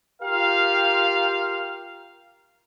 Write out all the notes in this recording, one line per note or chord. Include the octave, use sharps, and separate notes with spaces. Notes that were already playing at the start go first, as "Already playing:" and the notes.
F4 G4 A#4 F5